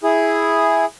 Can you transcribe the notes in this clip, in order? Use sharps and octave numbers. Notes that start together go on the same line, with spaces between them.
E4 G#4